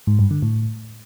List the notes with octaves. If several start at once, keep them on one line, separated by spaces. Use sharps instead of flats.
G#2
G2
D3
A2